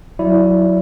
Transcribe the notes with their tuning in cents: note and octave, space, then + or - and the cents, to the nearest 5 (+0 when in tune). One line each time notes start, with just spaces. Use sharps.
F#3 -10 E4 +0 D5 -25